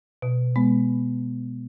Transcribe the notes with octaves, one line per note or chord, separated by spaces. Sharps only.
B2
G#3 B3